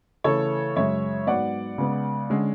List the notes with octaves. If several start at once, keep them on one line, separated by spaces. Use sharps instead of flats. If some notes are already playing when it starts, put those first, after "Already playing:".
C#3 E3 A3 A4 C#5
F#2 C#3 G#3 C#5 E5
G#2 F#3 B3 D5 F#5
C#3 G#3 B3
D3 G#3 C#4